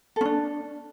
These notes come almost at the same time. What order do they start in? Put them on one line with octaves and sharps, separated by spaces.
A4 C#4 D4